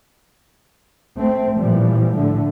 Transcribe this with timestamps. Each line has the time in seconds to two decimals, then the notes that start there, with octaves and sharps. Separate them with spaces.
1.17 A3 C4
1.58 A1 A#2 E3 F3 G3
2.14 A2 D3 A3